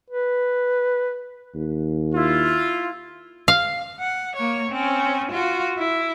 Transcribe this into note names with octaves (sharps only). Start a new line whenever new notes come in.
B4
D#2
E4 F4
F5
F#5
A#3 C#5
C4 C#4
F4 F#4
E4